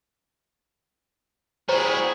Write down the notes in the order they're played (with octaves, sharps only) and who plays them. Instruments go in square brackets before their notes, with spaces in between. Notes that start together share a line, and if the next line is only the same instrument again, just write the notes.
[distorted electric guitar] G3 F#4 [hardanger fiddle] E4 G#4 [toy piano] C5 A#5